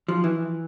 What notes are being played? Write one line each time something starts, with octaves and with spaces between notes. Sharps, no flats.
F3
E3